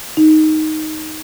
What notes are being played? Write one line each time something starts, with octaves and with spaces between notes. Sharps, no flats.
D#4